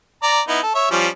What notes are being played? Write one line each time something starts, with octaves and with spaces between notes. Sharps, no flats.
D5 A#5
B3 D#4 E4
A4
C#5 E5
F3 G3 C#4